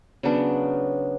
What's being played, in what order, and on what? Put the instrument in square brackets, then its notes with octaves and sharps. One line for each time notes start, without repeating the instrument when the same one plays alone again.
[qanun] C#3 F#3 B3 D4